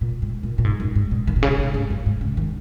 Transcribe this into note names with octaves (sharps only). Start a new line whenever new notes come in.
A#2
G#2
A#2
A#2
G#2
F#2
G#2
A#2
D#3
A#2
C#3
C#3
G#2
F#2
G#2
C#3
D#3